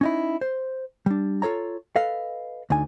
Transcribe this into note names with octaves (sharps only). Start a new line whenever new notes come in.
C#4 D#4 E4
C5
G3 D4
F4 A4 C#5 A#5
A4 B4 D#5 F5
D2 D3 D#4 G#5